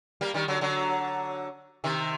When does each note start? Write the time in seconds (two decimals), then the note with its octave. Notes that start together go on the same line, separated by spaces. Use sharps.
0.21 G3 A#3
0.34 D#3 G3
0.48 D3 F#3
0.61 D3 F#3
1.84 C3 D#3